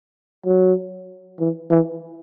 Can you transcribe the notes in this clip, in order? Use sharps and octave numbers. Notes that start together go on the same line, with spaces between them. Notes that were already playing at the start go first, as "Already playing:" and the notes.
F#3
E3
E3